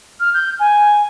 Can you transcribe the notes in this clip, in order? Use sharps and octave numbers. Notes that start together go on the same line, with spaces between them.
F6
G6
G#5